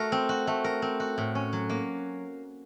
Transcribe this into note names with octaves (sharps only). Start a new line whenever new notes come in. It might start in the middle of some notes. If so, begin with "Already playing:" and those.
Already playing: A3 F#4 A#4
C4
F#4
A3
A#4
C4
F#4
A2
C#4
F#3
A#3